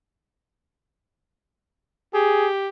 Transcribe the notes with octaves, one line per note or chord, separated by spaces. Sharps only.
G4 G#4